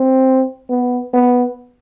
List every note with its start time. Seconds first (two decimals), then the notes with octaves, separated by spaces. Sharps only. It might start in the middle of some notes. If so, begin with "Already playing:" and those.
Already playing: C4
0.69 B3
1.13 B3